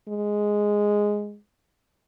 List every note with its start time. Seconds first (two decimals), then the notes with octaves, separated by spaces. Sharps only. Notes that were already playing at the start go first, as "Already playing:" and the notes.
0.08 G#3